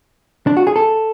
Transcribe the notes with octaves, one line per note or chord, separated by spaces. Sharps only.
D4
F#4
G#4
A4